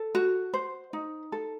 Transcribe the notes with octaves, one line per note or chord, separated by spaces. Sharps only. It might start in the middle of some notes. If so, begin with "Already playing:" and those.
Already playing: A4
F#4
C5
D#4
A4